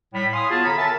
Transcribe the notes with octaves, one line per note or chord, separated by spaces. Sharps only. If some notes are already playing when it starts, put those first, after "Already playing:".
A2 G3 B5
C#5 F5 G#5 C6 D#6
B3 F4 F#4 G#4 F5 A5
D3 C#5 A#5 B5
A#4 E5 G#5 A5